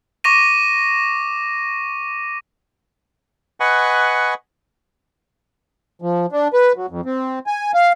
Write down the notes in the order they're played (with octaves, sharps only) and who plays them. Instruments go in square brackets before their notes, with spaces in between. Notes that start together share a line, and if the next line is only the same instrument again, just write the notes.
[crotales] C#6 D6 A#6 D#7
[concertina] B4 D#5 F#5 G#5 B5 C#6
[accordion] F3
D4
B4
F#3
F2
C4
G#5
F5